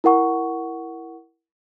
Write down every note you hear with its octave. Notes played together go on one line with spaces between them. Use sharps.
E4 A#4 F#5 C#6